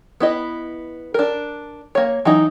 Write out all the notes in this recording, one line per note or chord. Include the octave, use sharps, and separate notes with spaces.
B3 E4 D#5
D4 A#4
A#3 C#5
E3 F#3 D#4